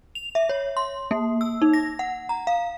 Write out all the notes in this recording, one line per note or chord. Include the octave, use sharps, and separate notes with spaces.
F7
E5
C#5
C6
A#3
E6
D#4
A#6
F#5
A#5
F5